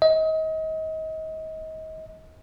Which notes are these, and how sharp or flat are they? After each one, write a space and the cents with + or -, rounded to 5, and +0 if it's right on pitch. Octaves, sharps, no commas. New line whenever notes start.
D#5 +30